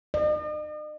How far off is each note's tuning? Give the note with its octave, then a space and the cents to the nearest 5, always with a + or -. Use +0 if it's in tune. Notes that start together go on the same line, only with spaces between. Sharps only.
D#5 -45